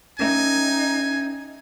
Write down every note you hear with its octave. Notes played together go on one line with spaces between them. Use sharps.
C#4 D#4 A#4 E5 G#5